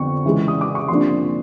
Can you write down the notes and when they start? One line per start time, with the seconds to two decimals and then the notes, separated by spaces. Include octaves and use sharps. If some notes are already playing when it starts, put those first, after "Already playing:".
Already playing: F2 D3 B3 C#6
0.25 C#3 E3 G#3
0.48 D#6
0.61 D6
0.75 C#6
0.88 F2 C3 F3 A#3 D4 C6